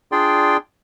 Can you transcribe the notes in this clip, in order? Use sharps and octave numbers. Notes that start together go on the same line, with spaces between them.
D4 F4 G#4 D5 G5 C6